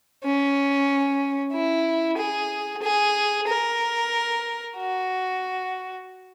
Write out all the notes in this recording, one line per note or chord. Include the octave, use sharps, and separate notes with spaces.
C#4
E4
G#4
G#4
A#4
F#4